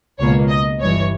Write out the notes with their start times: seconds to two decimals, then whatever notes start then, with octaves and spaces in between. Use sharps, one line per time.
0.19 C#2 B2 A#3 C#5
0.49 D#5
0.80 G1 G2 E3 C#5